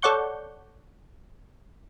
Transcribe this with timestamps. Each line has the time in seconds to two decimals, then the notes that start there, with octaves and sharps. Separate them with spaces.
0.02 A4 C#5 D5 F#5 C#6 G6